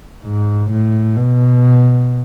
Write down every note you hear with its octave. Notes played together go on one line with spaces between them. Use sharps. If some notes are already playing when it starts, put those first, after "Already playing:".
G#2
A2
B2